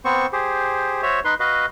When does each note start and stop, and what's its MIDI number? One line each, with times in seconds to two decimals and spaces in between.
0.05 0.26 59
0.05 0.26 60
0.05 0.26 72
0.05 0.26 85
0.33 1.02 67
0.33 1.02 68
0.33 1.02 72
1.02 1.20 66
1.02 1.20 72
1.02 1.20 73
1.02 1.20 76
1.25 1.34 63
1.25 1.34 71
1.25 1.34 84
1.40 1.66 66
1.40 1.66 71
1.40 1.66 75
1.40 1.66 77